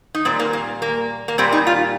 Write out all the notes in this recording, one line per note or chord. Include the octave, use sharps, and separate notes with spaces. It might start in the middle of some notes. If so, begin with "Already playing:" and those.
D#4
A#2 G3 C4
A#3
A#3
A#3
A#3
A#2 G3 C4
D#4
F4